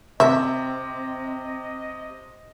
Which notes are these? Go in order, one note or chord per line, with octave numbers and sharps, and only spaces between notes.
C3 C4 D#5 E5